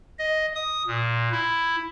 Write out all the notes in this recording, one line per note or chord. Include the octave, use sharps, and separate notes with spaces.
D#5
D#6
A#2
E4